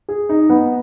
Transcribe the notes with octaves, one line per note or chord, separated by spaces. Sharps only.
G#4
D#4
B3